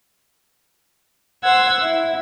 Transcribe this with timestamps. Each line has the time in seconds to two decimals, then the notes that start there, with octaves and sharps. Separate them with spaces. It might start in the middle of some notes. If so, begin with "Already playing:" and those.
1.43 C5 F#5 E6 G#6
1.80 E4